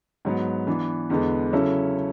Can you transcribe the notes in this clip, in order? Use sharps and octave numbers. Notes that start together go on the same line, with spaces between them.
G#2 F#3 B3
E3 B3 D4
E2 D3 G#3 B3
C#3 F#3 C#4 E4 A4